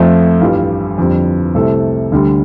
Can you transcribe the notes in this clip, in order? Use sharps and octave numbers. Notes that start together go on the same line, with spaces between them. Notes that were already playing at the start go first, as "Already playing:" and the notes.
Already playing: F2 F3 A3 C4
A1 G2 G3 F4
F2 D3 G3 C4
C2 C3 A3 C4 A4
D2 D3 G3